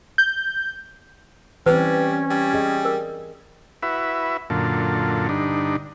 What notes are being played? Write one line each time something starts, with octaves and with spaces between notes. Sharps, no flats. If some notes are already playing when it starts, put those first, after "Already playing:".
G6
E3 G3 C4 C#4 B4
G3
G#4 D#5
A#4
E4 F#4 B4 E5
F#2 A#2 D3 F4 A4
G2 D3 D4 D#4